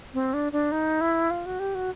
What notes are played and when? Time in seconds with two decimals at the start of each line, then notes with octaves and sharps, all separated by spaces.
0.14 C4
0.34 D4
0.52 D4
0.72 D#4
1.01 E4
1.31 F4
1.46 F#4
1.60 G4
1.75 F#4